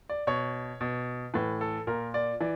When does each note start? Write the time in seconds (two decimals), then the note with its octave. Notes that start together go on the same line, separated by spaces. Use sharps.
0.09 D5
0.27 B2 C#5
0.81 B2
1.34 A2 E3 B4
1.61 A4
1.87 A#2 A#4
2.14 D5
2.41 E3 D5